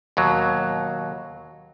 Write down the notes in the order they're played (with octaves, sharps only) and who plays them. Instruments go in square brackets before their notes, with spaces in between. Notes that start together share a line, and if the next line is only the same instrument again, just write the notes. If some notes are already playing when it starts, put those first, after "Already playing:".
[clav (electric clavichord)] D#2 B2 F#3